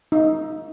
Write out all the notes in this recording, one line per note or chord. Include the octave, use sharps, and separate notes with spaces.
D#4